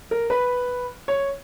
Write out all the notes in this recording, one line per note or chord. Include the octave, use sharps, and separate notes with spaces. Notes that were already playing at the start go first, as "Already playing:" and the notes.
A#4
B4
C#5